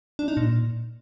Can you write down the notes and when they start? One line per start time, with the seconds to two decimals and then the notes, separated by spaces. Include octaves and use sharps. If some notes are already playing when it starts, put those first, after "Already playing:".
0.19 D4
0.28 D#4
0.37 A#2